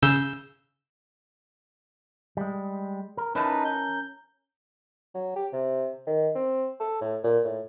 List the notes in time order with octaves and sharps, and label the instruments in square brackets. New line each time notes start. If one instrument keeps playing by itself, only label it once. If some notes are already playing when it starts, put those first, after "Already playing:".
[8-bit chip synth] C#3 E6 G6
[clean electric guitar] G3 G#3
A#4
[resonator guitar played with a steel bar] E3 A5 [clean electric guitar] C#4 A#4 [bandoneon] D#4 B4
[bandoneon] G6
[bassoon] F#3
G4
C3
D#3
C4
A4
A2
A#2
A2